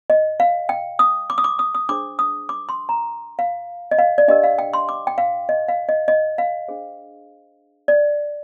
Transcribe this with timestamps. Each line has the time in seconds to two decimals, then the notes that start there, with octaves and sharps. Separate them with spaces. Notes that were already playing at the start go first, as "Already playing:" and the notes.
0.10 D#5
0.40 F5
0.69 G5
0.99 D#6
1.30 D6
1.38 D#6
1.44 D6
1.59 D#6
1.75 D#6
1.89 D4 G#4 C5 D6
2.19 D#6
2.49 D6
2.69 C6
2.89 A#5
3.39 F5
3.91 D#5
3.98 F5
4.18 D5
4.28 D4 G4 A#4 D#5
4.44 F5
4.59 G5
4.74 C6
4.89 D6
5.07 G5
5.18 F5
5.49 D#5
5.68 F5
5.89 D#5
6.08 D#5
6.38 F5
6.68 D4 G#4 C5
7.88 D5